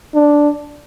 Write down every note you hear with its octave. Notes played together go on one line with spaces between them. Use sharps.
D4